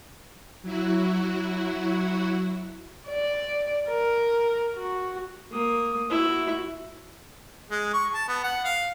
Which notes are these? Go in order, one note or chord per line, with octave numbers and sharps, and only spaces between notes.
F#3 E4 F#4
D5
A#4
F#4
A#3 D#6
E4 F#4
G#3
C#6
A5
B3
F#5
F5